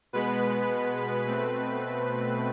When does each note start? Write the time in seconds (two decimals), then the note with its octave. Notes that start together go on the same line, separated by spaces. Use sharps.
0.13 B2 G#3 B3 B4
1.25 B2 A3 C4 B4